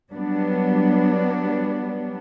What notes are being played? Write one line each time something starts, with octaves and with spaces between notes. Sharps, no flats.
F#3 G3 B3 D4